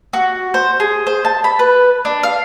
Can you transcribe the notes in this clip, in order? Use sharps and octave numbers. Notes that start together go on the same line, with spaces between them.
F#4
C5
G#4
C5
A5
B5
B4
D4
F5